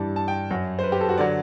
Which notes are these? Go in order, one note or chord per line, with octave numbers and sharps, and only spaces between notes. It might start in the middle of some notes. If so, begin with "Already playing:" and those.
Already playing: G2 E3 G3 A5
A5
G5
F#2 F#3
C5
B4
G4
A4
F#4
D3 F#3 D5